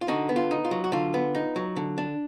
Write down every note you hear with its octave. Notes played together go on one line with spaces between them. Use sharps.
F4
D3 D#4 F#4
B3
F4
D#4
F4
F#3
F#4
D3 F4
B3
D#4
F#3
D3
D4